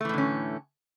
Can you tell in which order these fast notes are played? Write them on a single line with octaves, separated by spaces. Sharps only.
A3 E3 A2 D3 C#4